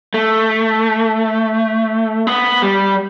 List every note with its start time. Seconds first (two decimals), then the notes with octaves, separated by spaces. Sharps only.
0.14 A3
2.27 B3
2.62 G3